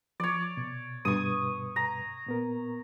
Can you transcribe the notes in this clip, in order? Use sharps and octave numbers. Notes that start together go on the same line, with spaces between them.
F3 C#5 D5
B2
G2 B2 B4 C#6 D#6
A#5
A#2 B3 A#4